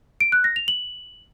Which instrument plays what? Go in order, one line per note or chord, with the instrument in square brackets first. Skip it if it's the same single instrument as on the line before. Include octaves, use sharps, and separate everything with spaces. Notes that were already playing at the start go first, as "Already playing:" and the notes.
[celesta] D7
F#6
A#6
F7
F#7